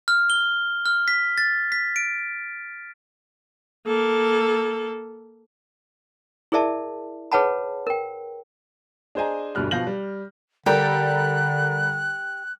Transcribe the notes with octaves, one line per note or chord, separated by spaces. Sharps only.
F6
G7
F6
B6
A6
B6
D7
A#3 A4
E4 G#4 A#4 D5 E5 A5
G#4 B4 C#5 F#5 A5 B5
A#4 G5
D4 G#4 C5 D#5 G#5 A#5
G1 D2 B2 G3 F6 F#6
B2 F3 F5 G6 A#6 F#7
G3
D3 G3 G4 A4 A#4 F#6